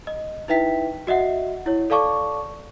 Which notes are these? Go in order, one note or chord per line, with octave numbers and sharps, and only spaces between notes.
D#5
D#4 E4 B4 E5 G5 B6
F#4 D#5 E5 F#5
E4 C#5
A4 D5 F5 A5 C#6 D6